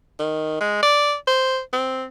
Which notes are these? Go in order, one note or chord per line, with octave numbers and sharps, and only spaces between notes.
D#3
G#3
D5
C5
C4